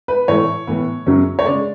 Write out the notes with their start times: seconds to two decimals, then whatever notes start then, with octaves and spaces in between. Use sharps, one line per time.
0.08 B4
0.28 A2 E3 A3 C#5
0.67 A2 E3 B3
1.06 F#2 C#3 F#3 C#4
1.39 C#5
1.45 C#3 G#3 D5